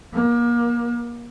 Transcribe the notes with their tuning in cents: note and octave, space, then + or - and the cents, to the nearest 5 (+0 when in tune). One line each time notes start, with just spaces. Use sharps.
A#3 +35